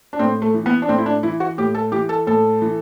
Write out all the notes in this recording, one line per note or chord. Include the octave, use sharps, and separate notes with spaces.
D4
A2 C4
A3
E3
B3
D4
A2 C4
E4
D4
E3 E4
F#4
A2 G4
A4
E3 G4
A4
A2 A4
E3